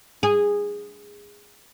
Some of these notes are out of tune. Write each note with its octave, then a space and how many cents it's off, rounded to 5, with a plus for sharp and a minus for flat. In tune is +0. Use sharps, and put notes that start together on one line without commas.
G#4 -15